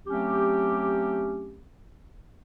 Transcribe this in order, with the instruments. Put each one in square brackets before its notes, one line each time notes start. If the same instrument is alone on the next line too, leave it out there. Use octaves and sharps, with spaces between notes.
[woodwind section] F#3 A3 C4 C#4 G4